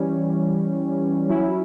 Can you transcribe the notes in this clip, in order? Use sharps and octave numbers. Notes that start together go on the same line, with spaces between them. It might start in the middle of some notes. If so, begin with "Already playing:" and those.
Already playing: E3 G3 C#4
F#3 C#4 E4